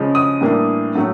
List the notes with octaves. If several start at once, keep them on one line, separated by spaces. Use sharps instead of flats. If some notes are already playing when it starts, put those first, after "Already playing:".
Already playing: C#3 F3 G#3
D#6
A2 E3 G3 A#3 D4
A2 F#3 A3